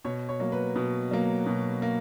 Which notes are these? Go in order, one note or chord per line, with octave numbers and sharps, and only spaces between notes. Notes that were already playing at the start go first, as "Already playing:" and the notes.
B2 C#5
C#5
F#3 A#3
B4
B2
F#3 A#3
B2
A#3